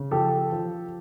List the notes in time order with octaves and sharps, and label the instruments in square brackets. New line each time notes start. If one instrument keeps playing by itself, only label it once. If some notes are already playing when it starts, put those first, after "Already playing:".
Already playing: [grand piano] C#3
F3 G4 A4
F3